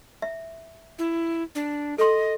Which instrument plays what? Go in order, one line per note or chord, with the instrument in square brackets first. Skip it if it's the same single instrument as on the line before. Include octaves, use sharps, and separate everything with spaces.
[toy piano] E5
[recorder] E4
D4
[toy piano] A4 C6 [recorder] D#5